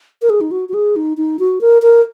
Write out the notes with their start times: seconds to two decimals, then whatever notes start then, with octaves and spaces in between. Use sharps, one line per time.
0.22 A#4
0.30 G#4
0.41 D#4
0.51 F#4
0.69 F#4
0.74 G#4
0.96 D#4
1.17 D#4
1.39 F#4
1.61 A#4
1.82 A#4